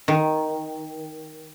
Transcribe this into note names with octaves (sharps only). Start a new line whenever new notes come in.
D#3